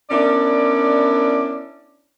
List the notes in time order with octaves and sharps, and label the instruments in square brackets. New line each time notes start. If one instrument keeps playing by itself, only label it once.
[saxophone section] B3 C#4 D4 E4 A#4 D5